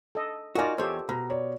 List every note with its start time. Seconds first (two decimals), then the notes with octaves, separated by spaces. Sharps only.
0.15 A4 D#5
0.55 D#4 F4 F#4 A#4 D5 D#5 G#5
0.78 E2 G4 A4 C5 C#5
1.09 B2 A#5
1.30 C#5 D5